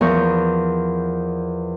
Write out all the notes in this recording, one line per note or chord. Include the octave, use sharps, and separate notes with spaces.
E2 E3 F3 A#4 C#6 G6